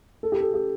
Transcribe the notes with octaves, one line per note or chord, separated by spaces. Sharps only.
A4
G4
A4
G4